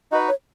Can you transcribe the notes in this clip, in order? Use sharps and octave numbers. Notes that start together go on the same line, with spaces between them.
D#4 F#4 B4 D#5
C#5